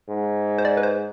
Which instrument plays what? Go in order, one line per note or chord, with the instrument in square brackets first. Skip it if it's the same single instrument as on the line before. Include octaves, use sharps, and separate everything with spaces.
[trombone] G#2
[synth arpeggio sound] C5
D5
B4
C5